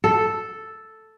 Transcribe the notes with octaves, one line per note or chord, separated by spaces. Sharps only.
A4